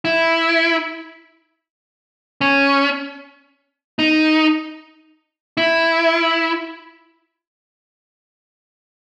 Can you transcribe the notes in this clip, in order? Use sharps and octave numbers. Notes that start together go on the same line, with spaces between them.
E4
C#4
D#4
E4